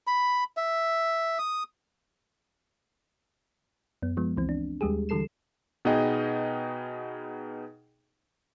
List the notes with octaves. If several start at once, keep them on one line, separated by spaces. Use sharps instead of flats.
B5
E5
D#6
F#2 B3
F3 G#3 B3
C#2 E3 C4
D4
D#2 G3 G#3 G4 G#4
D3 E3 G3 A4 C7 E7
B2 B3 D#4 G#4 D#5 G5